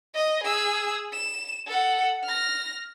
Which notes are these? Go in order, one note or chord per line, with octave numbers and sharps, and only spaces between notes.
D#5
G#4 E6
E7
A4 F#5
F6 A#6